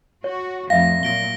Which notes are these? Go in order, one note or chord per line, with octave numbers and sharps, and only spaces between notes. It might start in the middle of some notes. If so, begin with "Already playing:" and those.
F#4 C#5
F2 A2 E5 F5 A#6
A#2 F#3 A#6 D7 G7